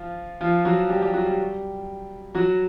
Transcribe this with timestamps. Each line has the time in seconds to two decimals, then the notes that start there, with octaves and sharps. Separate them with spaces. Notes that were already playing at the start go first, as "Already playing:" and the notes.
Already playing: F3 F4
0.41 F3 F4
0.65 F#3 F#4
0.90 G3 G4
1.02 G3 G4
1.14 F#3 F#4
1.26 G3 G4
2.35 F#3 F#4